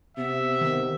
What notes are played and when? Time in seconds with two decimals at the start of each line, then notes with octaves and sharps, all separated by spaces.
0.17 C3 B3 E5
0.61 D#3